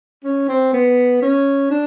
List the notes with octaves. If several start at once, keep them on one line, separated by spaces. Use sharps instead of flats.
C#4
C4
B3
C#4
D4